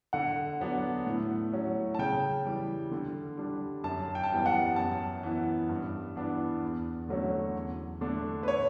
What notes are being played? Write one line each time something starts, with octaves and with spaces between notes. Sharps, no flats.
D3 F#5
F#3 B3 D4
A2
F#3 C#4
A5
C#3 G5
E3 G3
D3
G3 D4
F#2 A5
G5
A5
E3 G3 B3 G5
F#5
F#2 A5
E3 B3
G2
E3 B3 D4
E2
D3 F#3 A3 C#4
E2
D3 A3 D4
B4
C#5